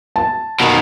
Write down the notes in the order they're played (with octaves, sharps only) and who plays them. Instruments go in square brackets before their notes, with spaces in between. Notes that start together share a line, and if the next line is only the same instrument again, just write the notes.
[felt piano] A5
[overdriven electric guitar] B2 D#3